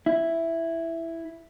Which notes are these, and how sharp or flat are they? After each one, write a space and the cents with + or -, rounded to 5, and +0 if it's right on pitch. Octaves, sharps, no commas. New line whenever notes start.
E4 +5